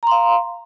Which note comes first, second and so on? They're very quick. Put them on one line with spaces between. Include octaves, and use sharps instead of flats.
A#5 C6 F5